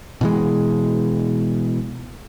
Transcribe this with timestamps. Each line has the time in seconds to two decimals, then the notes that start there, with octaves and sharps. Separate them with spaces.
0.21 B2 E3 G#3